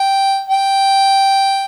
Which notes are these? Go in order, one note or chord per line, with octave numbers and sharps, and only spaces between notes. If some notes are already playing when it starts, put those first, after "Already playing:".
Already playing: G5
G5